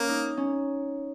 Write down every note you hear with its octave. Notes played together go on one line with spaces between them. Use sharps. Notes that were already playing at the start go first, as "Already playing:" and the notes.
Already playing: A#3 C#4
D#4
C#4